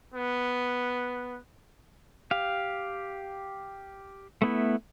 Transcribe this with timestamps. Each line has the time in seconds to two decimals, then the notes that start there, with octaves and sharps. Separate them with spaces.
0.14 B3
2.31 G4 F5
4.42 A3 B3 E4